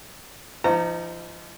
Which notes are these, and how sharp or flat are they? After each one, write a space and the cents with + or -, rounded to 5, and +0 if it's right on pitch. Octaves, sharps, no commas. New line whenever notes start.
F3 -35 D#4 +0 A#5 -25